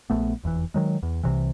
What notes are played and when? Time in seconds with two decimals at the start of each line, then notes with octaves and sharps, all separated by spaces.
0.10 A#1 A3 B3
0.43 F1 E2 A2 E3
0.74 D#3 F#3 G#3
1.03 E2
1.23 C2 C3 E3